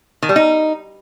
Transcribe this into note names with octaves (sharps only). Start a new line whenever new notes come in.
D#3
G3
D#4